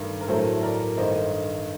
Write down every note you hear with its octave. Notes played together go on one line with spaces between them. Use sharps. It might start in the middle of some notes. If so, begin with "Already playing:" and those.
Already playing: G2 D#3 A3 A#4
A#4
A2 F#3 A3 A4 C5
A#4 D5
G2 D#3 A3 C5 D#5